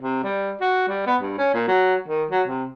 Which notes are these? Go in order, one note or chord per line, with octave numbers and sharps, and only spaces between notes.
C3
G3
F#4
G3
B3
G2
C#4
A#2
F#3
D#3
F#3
C3